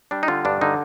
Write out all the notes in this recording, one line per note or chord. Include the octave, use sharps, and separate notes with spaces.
G3 D4
D#4
D3 F4
G2 D4
D3 D#4